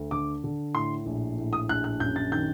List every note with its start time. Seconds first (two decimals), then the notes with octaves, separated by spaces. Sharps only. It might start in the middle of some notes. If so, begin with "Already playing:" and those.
Already playing: D2
0.11 D3 D6
0.44 D3
0.74 A2 C6
1.06 A#1
1.38 A2
1.53 D#6
1.69 A#1 F#6
1.84 F#6
2.00 F#2 G6
2.16 A6
2.32 D#3 G6